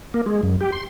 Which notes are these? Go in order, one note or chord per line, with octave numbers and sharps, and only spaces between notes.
A#3
G#3
F#2
G4
C6